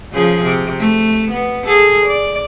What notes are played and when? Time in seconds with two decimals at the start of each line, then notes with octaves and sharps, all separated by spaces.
0.12 C#3 F3 G#4
0.42 C3
0.79 A3
1.31 B3
1.67 G#4 A4
2.06 D5